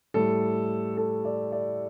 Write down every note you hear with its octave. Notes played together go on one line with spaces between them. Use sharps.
A2 G3 A4
A4
D5
D5